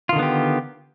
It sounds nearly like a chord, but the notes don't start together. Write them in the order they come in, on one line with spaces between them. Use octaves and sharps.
F4 D#3 D3 B3 G4